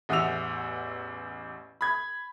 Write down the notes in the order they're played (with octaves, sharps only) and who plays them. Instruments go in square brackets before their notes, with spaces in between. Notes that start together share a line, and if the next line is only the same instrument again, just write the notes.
[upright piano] A1 E2 E5 F#5 E6 F7
B5 G#6